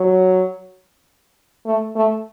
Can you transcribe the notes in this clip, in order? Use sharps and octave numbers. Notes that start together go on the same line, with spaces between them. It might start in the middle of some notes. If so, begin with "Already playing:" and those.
Already playing: F#3
A3
A3